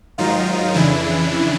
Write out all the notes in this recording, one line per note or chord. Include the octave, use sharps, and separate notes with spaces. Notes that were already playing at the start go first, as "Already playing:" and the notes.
G#2 D#3 F#3 D#4 F4
F2 C#3 E3 D4 E4